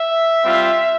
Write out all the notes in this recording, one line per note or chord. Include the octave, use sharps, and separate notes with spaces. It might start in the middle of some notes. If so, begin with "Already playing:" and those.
Already playing: E5
G3 C4 F4